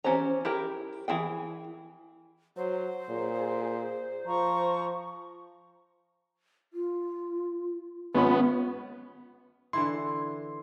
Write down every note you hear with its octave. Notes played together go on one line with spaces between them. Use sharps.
E3 C#4 G4 C5 A#5
E4 G4 A#4
E3 E4 G#4 G5
F#3 C5
A#2 G#4
F3 A#5 C#6
F4
G#1 B3 C#4 F4 B5
D3 E3 E4 C6